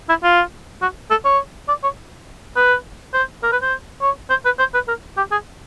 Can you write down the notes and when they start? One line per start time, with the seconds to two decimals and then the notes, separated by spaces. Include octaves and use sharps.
0.09 E4
0.23 F4
0.82 F#4
1.10 A4
1.25 C#5
1.68 D5
1.83 C#5
2.56 B4
3.14 C5
3.43 A#4
3.52 B4
3.62 C5
4.01 C#5
4.30 C5
4.45 B4
4.59 C5
4.74 B4
4.88 A#4
5.17 G4
5.32 G#4